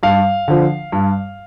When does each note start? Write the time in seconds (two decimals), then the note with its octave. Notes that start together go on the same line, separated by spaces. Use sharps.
0.03 G2 F5
0.48 D3 F3
0.92 G2